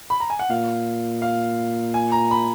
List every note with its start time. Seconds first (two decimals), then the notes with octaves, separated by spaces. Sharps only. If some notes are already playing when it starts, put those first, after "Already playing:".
0.10 B5
0.20 A#5
0.30 G#5
0.39 F#5
0.50 A#2 F5
1.22 F5
1.94 G#5
2.12 A#5
2.31 B5